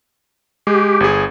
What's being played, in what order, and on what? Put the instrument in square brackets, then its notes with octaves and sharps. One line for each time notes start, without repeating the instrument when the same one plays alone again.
[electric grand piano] G#3 [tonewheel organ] G4
[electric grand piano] G1 G#4